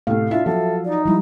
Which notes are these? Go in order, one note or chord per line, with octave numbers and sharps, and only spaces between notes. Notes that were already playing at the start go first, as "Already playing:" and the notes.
A2 C3 A3 F5
D4 E4 F4 E5
F3 F#3 A4 E5
D#4 D5
F3 G3 G#3 E4